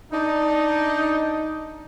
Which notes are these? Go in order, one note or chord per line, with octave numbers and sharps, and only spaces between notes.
D4 D#4